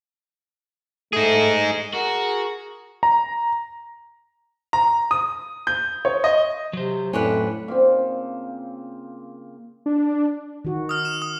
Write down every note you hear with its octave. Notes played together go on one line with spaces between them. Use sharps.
A3 D#4 G#4
F#4 G#4 A#4
A#5
A#5
D#6
G6
C#5
D#5
C3 F#3 C5
F2 A2 C#4 D4 B4
A#2 C#3 C4
D4
D#3 F#4
D#6 F6
E7
D#6